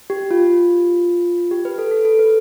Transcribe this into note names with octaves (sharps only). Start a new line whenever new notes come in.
G4
F4
G4
B4
A4
A4
A4
B4